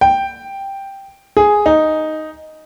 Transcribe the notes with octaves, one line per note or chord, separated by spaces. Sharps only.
G5
G#4
D#4